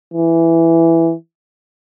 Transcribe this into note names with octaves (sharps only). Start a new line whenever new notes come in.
E3